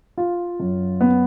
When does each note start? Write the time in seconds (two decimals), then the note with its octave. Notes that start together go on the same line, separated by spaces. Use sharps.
0.18 F4
0.60 F#2
1.01 B3